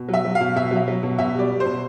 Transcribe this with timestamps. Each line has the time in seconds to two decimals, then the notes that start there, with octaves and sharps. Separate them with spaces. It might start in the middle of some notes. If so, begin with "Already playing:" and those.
Already playing: B2
0.08 F#3
0.14 E5
0.25 F#3
0.35 F5
0.41 B2
0.56 B2 E5
0.71 F#3
0.77 E5
0.88 F#3
1.03 B2
1.18 B2 E5
1.34 G3 D5
1.50 G3
1.60 C5
1.65 B2